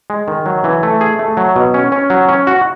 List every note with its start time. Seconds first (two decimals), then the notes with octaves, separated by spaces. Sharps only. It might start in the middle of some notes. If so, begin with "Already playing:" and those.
0.10 G#3
0.28 D#3
0.46 F#3
0.64 E3
0.83 A3
1.01 G#4
1.19 A3
1.37 F#3
1.56 B2
1.74 C#4
1.92 C#4
2.10 F#3
2.29 C#4
2.47 F#4